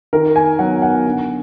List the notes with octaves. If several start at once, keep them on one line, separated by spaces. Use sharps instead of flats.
D#3 A#4
G#5
F#3 B3 F#5
F#5
D3